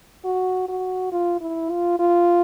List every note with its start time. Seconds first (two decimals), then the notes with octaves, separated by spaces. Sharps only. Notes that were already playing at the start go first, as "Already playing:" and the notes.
0.25 F#4
0.69 F#4
1.12 F4
1.41 E4
1.70 F4
1.99 F4